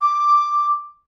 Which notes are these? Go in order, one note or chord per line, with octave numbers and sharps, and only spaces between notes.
D6